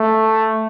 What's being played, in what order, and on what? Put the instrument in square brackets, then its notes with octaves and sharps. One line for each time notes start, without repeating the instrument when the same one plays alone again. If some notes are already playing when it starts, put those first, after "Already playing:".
Already playing: [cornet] A3